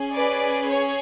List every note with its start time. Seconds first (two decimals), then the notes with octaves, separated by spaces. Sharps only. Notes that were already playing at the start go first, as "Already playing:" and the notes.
Already playing: C#4 G#4
0.14 B4 D5
0.68 C#5